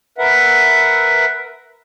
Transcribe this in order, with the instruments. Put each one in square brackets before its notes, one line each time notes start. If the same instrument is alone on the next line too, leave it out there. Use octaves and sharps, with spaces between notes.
[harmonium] A#4 B4 E5 F#5